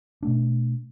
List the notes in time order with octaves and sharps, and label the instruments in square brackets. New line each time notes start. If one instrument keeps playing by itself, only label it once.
[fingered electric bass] B2 A3 D4